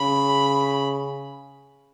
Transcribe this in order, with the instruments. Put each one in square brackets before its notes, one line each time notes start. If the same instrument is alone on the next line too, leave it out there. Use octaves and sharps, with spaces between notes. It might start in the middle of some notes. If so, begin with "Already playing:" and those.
Already playing: [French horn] C#3 [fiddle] B5